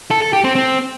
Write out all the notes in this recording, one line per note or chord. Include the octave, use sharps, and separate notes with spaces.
A4
A4
G4
C4
C4